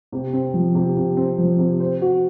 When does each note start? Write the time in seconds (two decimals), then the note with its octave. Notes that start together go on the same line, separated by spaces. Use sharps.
0.12 C3
0.33 C4
0.54 F3
0.75 C3
0.97 C3
1.17 C4
1.38 F3
1.59 C3
1.80 C5
2.02 F#4